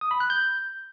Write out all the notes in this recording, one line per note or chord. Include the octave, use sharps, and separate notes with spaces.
D#6
B5
F#6
G6